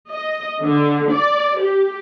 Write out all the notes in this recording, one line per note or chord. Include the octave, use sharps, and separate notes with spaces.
D#5
D3
D5
G4